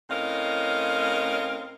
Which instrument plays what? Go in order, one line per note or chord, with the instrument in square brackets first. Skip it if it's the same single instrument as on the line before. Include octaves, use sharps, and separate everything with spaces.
[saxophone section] A2 C4 C#4 A#4 D#5 F5